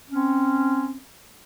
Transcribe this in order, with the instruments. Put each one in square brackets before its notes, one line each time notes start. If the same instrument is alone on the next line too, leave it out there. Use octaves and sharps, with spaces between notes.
[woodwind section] C4 C#4